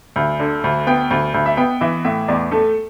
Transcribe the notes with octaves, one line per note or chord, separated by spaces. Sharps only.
D2
D3
D2
B3 G5
D2
D2
E5
B3 G5
E3 E5
A2 E5
E2 D5
A3 A4